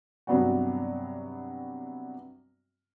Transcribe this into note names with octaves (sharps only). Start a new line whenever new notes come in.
G2 C3 F#3 B3 D4 F#4